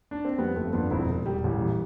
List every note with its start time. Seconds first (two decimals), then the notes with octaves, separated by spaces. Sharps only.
0.11 D4
0.25 C4
0.38 F2 G3 B3
0.56 G1 A3 C4
0.73 F2 B3 D4
0.91 E1 C4 E4
1.09 E1
1.26 E1 G3
1.44 A1 G3
1.61 E3